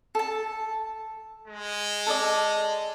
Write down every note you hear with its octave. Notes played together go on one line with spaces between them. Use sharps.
A4 A5
G#3
A4 D5 D#5